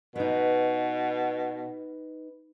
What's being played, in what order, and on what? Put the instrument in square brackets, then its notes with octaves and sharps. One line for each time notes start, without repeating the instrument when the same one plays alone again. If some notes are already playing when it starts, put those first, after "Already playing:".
[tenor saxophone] B2 [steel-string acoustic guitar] D#4 B4